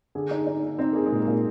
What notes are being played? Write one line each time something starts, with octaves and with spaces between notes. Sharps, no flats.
D3 G#4
D#4
D#4
D#4
C4 D#4
A#3 G#4
G#3
A#2
A#3
A#2